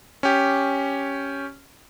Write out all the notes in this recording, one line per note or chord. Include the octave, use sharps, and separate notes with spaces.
C#4 G4